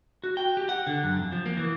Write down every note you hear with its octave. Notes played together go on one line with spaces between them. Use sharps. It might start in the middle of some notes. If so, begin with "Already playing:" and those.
F#4
G5
G4
F#5
D3
F#2
F2
F3
A#3
E3